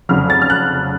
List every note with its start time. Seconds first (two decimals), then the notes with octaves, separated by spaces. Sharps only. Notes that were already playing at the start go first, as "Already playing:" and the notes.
0.09 F1 F2 C#3 F#3 F6
0.30 A6
0.42 F6
0.50 F#6